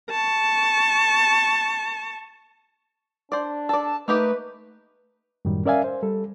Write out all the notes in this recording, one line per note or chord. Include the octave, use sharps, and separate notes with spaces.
A5 C#6
D4 C5 D5
A4 D5 A5
A3 A#3 D#4 G4 B4
F#2 A2 D#3 G3
C#4 A#4 D5 E5 F5 G#5
C5
G3 A4